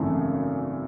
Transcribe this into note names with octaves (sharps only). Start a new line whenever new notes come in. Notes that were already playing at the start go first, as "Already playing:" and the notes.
Already playing: G#1 F#2 C#3 E3 A3